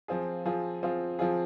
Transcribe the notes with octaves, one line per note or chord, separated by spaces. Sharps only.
F3 C4 F4 G#4
F3 C4 F4 G#4
F3 C4 F4 G#4
F3 C4 F4 G#4